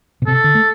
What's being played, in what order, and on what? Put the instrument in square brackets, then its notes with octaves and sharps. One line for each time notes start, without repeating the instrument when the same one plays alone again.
[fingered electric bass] B2
[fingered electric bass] C3 [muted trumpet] A4
[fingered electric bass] D3
A3